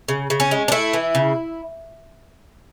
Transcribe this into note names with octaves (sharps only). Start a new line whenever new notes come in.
C#3
C#3
C#4
G#3
D4
A3 E4
E3
C#3